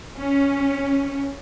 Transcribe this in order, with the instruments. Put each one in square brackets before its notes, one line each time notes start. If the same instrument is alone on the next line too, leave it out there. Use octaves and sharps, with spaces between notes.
[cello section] C#4